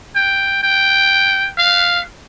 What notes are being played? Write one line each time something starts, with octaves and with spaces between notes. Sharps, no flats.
G5
G5
F5